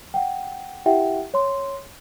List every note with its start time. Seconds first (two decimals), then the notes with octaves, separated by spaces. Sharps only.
0.14 F#5 G5
0.86 E4 G4 E5 F#5 G5
1.34 C#5 C6